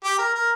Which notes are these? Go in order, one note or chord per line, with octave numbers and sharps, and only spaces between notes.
G4
A#4
A#4